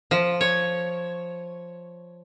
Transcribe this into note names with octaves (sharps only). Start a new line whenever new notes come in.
F3
C#5